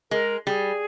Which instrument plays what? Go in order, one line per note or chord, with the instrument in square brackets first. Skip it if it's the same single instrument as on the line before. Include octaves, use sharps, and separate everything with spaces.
[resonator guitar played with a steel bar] G#3 [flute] A#4
[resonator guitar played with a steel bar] G3 [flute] G#4